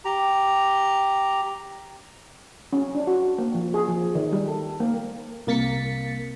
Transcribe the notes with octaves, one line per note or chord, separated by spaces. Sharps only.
G4 A#5
C#4
D4
F#4
A#3
F3
G#4
F3
D#3
G3
A4
A#3
C2 A#3 A6 B6 C#7